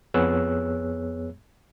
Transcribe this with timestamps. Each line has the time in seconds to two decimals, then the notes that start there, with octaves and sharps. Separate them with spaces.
0.14 F2 B3 G#4 C#5 E6 F#6